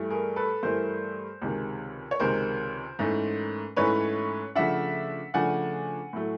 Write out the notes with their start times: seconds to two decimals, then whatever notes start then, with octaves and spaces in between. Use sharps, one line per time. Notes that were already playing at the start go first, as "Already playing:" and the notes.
Already playing: G2 E3 A3
0.10 G#4 A#4
0.36 A4 B4
0.63 G2 E3 A3 A#4 C5
1.42 C#2 C3 D#3 G#3
2.11 C#5
2.20 C#2 C3 D#3 G#3 A#4 C5
2.99 G#2 E3 A3 C#4 E4
3.76 G#2 E3 A3 C#4 E4 B4 C#5
4.55 C#3 F3 A3 D4 E5 F#5
5.34 C#3 F3 A3 D4 F#5 G#5
6.13 A2 F#3 A3